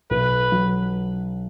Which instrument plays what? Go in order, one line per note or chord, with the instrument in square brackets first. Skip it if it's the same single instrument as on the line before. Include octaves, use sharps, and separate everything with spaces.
[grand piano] B1 [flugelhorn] B4
[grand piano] F#3